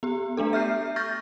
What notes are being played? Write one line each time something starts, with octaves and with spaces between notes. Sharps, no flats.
B3 G4
A3 B3 D4 A4
E5 F6 G6 C7
C#6 F6 G6 A6 A#6